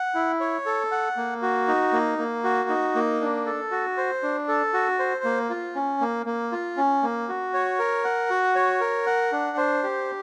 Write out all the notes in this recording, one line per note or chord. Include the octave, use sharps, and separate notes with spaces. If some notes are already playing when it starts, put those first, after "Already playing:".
Already playing: F#5
E4
C#5
A4
F#5
A#3
F#4
D#4
A#3
A#3
F#4
D#4
A#3
D4
A4
F#4
C5
D4
A4
F#4
C5
A#3
F4
C#4
A#3
A#3
F4
C#4
A#3
F#4
C#5
A#4
F#5
F#4
C#5
A#4
F#5
D4
C5
G4